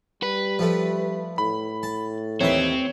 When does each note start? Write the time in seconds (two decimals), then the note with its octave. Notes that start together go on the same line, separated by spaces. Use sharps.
0.23 G3 B4
0.59 F3 A3
1.38 A2 B5
1.83 A5
2.41 D#2 E3 C4 B4 C#5